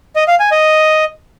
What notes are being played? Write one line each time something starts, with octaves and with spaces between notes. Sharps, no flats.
D#5
F5
G#5
D#5